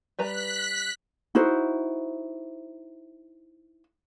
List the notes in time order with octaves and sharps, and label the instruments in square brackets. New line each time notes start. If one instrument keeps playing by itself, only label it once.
[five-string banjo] G3 B4 A#5 [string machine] F#6 B6
[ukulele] D#4 E4 F#4 C5